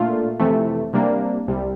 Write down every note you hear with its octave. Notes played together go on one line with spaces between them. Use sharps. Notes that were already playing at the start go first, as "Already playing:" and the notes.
Already playing: A#2 A3 D4 F4
F2 C3 E3 A3
C3 G3 A#3 D4
C2 C3 G3